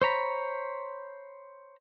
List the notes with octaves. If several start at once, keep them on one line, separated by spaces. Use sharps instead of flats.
C5 C#5 A#5 B5